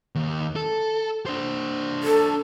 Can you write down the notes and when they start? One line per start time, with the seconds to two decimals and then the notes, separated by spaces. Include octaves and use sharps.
0.15 D#2
0.56 A4
1.26 D4 C5
2.04 A4